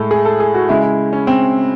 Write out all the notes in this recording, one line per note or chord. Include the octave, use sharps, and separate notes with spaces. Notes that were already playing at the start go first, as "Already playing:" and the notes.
Already playing: A2 G#3 A4
G#4
A4
G#4
F#4
C#3 G#3 E4
E4
C#4
C4